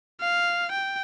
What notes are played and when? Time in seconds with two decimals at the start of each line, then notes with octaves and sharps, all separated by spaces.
0.21 F5
0.71 G5